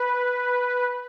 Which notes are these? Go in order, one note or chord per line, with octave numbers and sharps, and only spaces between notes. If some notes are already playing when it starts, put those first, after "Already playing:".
Already playing: B4